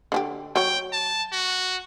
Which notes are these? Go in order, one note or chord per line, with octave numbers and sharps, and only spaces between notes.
D3 C#4 G4
F#3 C#5 G5
A5
F#4